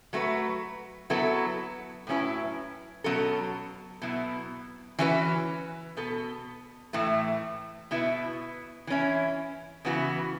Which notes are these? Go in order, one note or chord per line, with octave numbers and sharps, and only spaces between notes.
F#3 A3 F#4 B4
F#3 B3 E4 A4
A2 F#3 C#4 E4 B4
B2 F#3 C#4 A4
B2 F#3 B3 E4
E3 C#4 F#4 B4
B2 B3 A4
A2 E3 A3
B2 B3 E4 B4
E3 C#4 E4
C#3 E3 B3 F#4